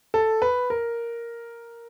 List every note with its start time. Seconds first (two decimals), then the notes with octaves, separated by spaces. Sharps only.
0.14 A4
0.42 B4
0.70 A#4